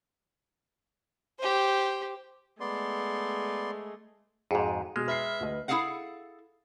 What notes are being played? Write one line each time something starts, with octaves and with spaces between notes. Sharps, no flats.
G4 C5
G#3 A3 B3 D5 C6
F2 G#2 F#4 G#4
B2 G#3 G#4 F6
B4 E5 F6 C7
D2 D#5
E4 F4 G#4 A4 F5 F#5